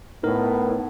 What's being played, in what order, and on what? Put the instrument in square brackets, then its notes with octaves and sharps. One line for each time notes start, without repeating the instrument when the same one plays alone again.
[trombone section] A2 B3 [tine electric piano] D#4 A#4